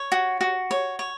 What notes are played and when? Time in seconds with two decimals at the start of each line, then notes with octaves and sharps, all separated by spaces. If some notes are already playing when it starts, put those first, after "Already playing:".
Already playing: C#5
0.12 F#4
0.41 F#4
0.71 C#5
0.99 C#5